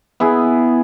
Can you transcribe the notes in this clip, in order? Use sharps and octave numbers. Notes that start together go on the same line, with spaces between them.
B3 E4 G#4